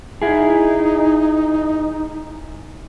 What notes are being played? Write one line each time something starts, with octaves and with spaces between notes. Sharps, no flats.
D#4 E4 G#4